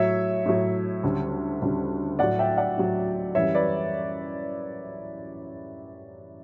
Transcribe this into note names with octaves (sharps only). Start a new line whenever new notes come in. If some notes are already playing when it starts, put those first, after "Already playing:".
Already playing: A2 F#3 C#5 E5
A2 F#3
D2 C#3 G3
D2 C#3 G3
A2 F#3 D5 F#5
E5 G5
D5 F#5
A2 F#3
F#2 E3 G3 C#5 E5
B4 D5